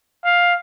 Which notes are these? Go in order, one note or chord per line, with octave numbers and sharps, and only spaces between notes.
F5